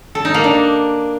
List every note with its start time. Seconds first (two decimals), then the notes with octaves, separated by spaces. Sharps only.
0.15 A4
0.25 D#4
0.34 A#3
0.44 D4